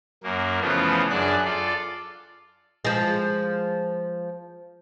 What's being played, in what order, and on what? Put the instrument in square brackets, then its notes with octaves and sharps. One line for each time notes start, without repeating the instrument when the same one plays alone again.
[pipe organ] F#2 A#3
C#3 E3 F3 A3 B3
F#2 D4 G#4 D5 F#6
F4 A4 D5
[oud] F3 G#3